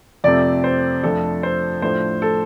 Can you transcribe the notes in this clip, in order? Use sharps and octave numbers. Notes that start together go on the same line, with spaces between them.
F2 C3 A3 C4 D5
C5
F2 F3 A3 D4 A4
C5
A2 F3 A3 D4 C5
A4